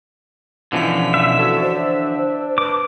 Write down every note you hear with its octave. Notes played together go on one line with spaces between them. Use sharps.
B2 D3 E3 F3 C#4 B6
E5
F#4 A4 C#5
D4 C5
B4 D6